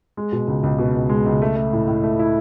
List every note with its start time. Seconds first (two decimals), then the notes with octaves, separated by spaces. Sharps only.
0.17 G#3
0.32 B2
0.48 C#2
0.63 C#2
0.79 B2
0.95 C#2
1.09 G#3
1.26 C#2
1.42 A3
1.56 A3
1.73 A2
1.88 A2
2.04 A3
2.19 E4